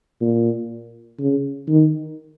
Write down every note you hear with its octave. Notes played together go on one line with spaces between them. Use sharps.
A#2
C#3
D#3